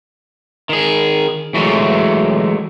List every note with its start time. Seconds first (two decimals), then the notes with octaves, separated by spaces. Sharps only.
0.69 D#3 G#4
1.54 E3 F#3 G#3 A3